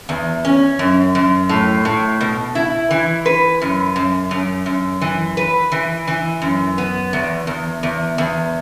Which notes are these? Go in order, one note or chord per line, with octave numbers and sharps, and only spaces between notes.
E2
C#4
F#2
F#2
A2
A2
B2
E4
E3
B4
F#2
F#2
F#2
F#2
E3
B4
E3
E3
F#2
B3
E2
E2
E2
E2